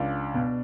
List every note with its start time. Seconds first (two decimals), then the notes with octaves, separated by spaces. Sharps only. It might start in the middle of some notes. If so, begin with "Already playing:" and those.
Already playing: C#2 D4
0.34 B2